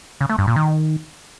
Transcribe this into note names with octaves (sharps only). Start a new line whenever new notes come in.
C#3
A3
G2
A#2
D#3